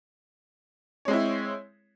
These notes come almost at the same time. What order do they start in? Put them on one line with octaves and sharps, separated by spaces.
C#5 G#3 C4 E4